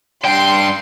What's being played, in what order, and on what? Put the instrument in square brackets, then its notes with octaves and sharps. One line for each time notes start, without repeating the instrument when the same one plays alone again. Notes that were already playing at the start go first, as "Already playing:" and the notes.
[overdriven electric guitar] G2 G5 [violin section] C6